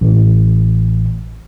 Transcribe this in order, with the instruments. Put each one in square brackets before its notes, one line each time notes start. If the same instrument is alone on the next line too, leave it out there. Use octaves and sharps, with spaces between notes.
[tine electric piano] A1